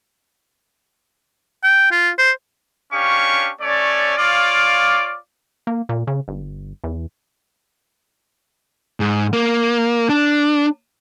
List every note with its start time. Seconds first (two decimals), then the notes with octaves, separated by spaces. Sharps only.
1.63 G5
1.92 F4
2.18 C5
2.93 C#4 D4 G4 C#5 F5 C#6
3.61 A3 C#4 C#5 D5
4.18 F4 C#5 D5 F5 D6
5.67 A#3
5.89 A#2
6.07 C#3
6.28 G1
6.84 E2
9.00 G#2
9.33 A#3
10.09 D4